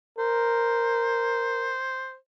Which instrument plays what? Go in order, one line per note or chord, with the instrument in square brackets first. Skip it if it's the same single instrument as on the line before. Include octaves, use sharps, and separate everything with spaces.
[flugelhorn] A#4 [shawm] C5